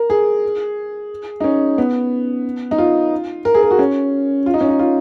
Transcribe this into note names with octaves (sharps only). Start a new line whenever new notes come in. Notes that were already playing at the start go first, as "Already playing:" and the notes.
Already playing: A#4
G#4
D#4
C#4
B3
D#4
F4
A#4
G#4
A#4
F#4
C#4
F4
D#4
C#4
D#4
F4